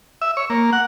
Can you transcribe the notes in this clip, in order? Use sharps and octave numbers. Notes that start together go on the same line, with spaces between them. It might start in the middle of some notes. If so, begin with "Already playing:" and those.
E5
C#5
A#3
F#5